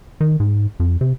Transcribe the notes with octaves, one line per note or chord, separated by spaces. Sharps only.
D#3
G#2
F2
C3